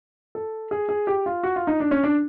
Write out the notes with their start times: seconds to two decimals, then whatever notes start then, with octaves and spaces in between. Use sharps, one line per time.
0.35 A4
0.71 G#4
0.89 G#4
1.07 G4
1.26 F4
1.43 F#4
1.56 F4
1.67 D#4
1.80 D4
1.91 C#4
2.04 D4